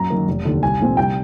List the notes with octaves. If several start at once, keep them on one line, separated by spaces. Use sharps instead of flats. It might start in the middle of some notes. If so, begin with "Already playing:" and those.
Already playing: F#2 A#5
D#3 F#3 A#3
F1
D#2 D3
C2 G#5
A#2 F3 A3 C4
C2 G5